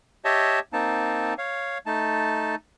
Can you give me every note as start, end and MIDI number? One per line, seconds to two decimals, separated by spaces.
0.25 0.59 67
0.25 0.59 73
0.25 0.59 75
0.25 0.59 76
0.25 0.59 81
0.73 1.34 58
0.73 1.34 60
0.73 1.34 63
0.73 1.34 81
1.38 1.78 73
1.38 1.78 77
1.86 2.55 57
1.86 2.55 63
1.86 2.55 81